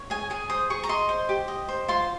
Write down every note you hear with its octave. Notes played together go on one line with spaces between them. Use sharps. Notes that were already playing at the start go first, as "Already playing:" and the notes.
Already playing: C#5
G#4 G#5
G#4 G#5
C5 D#6
G#4 C#6
A#5
D#5 C6
C5
G4
D#5
C5
F4 C6